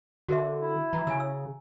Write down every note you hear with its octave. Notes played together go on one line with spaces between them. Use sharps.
D3 F#4 A#4 E5
E4
E3 A#5
C#3 G#5 E6
E6